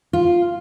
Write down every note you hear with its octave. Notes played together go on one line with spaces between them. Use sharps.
F4